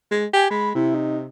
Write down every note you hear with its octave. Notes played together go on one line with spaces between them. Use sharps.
G#3
G4 G#5
G#3 B5
C3 E4
D#4